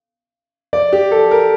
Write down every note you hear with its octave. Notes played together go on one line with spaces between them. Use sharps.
D5
G4
A4
A#4